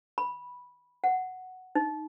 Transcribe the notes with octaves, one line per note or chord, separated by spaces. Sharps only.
B5
F#5
D#4